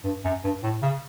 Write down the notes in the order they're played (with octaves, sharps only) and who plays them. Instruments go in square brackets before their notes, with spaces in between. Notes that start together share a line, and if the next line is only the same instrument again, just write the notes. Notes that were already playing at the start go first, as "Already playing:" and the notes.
[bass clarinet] G2
F#2
G2
A2
C#3